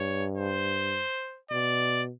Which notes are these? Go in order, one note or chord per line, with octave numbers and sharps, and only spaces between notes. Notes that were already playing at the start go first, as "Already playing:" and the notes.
Already playing: G2 C#5
C5
B2 D5